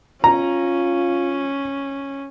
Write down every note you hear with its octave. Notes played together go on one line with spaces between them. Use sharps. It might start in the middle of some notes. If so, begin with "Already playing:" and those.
C#4 F4 A#5